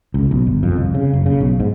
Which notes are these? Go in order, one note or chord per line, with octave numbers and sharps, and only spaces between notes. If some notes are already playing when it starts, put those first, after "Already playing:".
C#2
B1
G1
F2
C2
C#3
F#1
C#3
B1
G#2